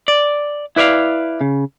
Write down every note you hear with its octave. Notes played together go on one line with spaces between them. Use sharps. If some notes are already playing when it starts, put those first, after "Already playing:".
D5
E4 B4 D5 E5 F5
C#3